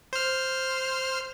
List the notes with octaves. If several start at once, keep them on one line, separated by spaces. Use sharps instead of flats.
C5 F6